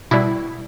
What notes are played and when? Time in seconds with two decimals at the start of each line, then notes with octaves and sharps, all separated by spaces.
0.11 B2 G3 E4